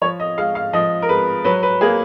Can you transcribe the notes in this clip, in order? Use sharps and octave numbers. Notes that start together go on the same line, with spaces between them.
F3 C#5
D#5
G#3 F5
F5
F3 D#5
A#4
G#3 B4
F#3 B4
B4
A#3 G#4